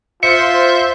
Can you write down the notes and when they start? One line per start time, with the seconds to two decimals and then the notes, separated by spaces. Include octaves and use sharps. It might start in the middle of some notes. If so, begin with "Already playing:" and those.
0.23 F4 C5 E5 C6 C#7